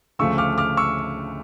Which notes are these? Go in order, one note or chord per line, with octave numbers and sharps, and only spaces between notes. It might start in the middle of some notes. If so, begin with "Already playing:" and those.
D2 C#3 F3 A3 C#6 E6
D6 F6
D6 F6
C#6 E6